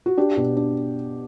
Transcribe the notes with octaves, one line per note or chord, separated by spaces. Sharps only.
F#4
D4 G4
B2
D4